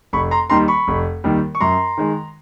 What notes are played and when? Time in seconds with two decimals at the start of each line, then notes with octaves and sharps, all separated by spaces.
0.13 F1 B5 C#6
0.31 A#5 C6
0.50 D#2 D#3 G3 A#5 C6
0.68 B5 C#6
0.88 F1
1.24 D#2 D#3 G3
1.55 C#6
1.61 F#2 A#5 C6
1.98 D#3 G#3